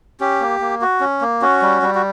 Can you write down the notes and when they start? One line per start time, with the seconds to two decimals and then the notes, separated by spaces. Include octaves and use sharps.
0.20 C#4 G4
0.40 A#3
0.60 A#3
0.81 F#4
1.00 C#4
1.21 A#3
1.42 C#4 F#4
1.62 G3
1.82 G3
1.95 F#4